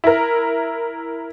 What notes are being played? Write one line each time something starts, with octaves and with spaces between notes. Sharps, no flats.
E4 A#4